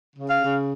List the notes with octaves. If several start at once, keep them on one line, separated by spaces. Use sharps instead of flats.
C#3
F5
C#3